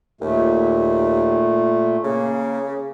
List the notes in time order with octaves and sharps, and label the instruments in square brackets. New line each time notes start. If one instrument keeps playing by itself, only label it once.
[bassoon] D#2 [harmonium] A#2 A3
[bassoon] C#3 [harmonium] A#3